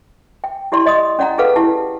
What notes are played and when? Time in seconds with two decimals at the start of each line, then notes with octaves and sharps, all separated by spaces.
0.44 G5
0.72 E4 G4 D5 C6
0.86 D5 D#5 C6 D#6
1.19 C#4 D5 F#5 G5 A#5
1.38 G#4 A4 B4 F5 F#5
1.56 E4 G4 A5